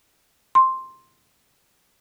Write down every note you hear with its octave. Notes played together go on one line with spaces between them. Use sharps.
C6